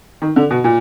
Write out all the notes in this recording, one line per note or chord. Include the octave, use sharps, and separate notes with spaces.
D#3
D3
B2
A#2